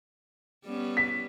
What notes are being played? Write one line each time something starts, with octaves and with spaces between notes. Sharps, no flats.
G3 B3 C#4
B6